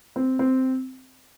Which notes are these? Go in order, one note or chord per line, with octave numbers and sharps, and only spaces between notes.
C4
C4